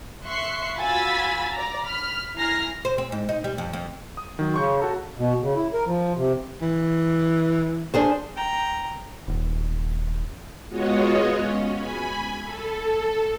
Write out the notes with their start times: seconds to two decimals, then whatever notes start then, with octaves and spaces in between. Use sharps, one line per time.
0.25 E5 C6 C#6 F#6 C7
0.78 F4 F#4 G#5 B5 E6 A6
1.52 D5 A#5
1.86 B5 F6
2.37 E4 G#5 A#5 F6 A#6 C7
2.85 C5
2.98 C4
3.12 G#2
3.29 D#4
3.44 G3
3.58 F2
3.73 F2
4.17 D#6
4.39 D#3 F#3
4.54 C#3 C6 C#6 G6
4.80 F#4 A4 A#5
5.18 B2
5.42 C#3
5.56 E4
5.74 A#4
5.86 F3
6.17 C3
6.62 E3
7.94 D4 G#4 C5
8.36 G5 A#5
9.28 D#1
10.69 G#3 B3 F4 F#4 C#5 D#5
11.37 C#4
11.74 G#5 B5
12.43 A4